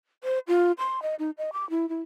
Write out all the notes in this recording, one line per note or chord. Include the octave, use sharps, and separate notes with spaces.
C5
F4
C6
D#5
D#4
D#5
D6
E4
E4